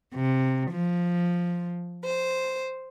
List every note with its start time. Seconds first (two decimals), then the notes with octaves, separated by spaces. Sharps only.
0.15 C3
0.70 F3
2.04 C5